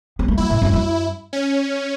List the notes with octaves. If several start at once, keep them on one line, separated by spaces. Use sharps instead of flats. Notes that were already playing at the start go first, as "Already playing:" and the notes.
B3
A3
F#3 E4
A2
F#2
F#2
C#4